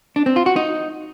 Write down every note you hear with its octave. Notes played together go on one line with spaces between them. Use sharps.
D4
C4
F4
F#4
D#4